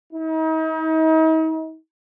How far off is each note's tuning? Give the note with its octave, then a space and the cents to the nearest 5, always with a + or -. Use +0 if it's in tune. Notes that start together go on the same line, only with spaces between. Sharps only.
D#4 +40